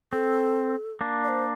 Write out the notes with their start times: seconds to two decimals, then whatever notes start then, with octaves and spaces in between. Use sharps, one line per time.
0.12 C4 A4
1.01 A#3 D4
1.24 D5
1.29 C5